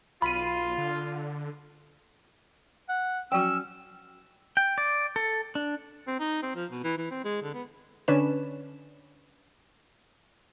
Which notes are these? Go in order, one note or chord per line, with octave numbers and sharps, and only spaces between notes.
B1 F4 B5 D#7
D3
F#5
F3 F#3 C#4 F#4 G5 E6
G5
D5
A4
D4
C4
D#4
C4
F3
B2
E3
E3
C4
G#3
D3
B3
D3 C#4 D4 B4 E7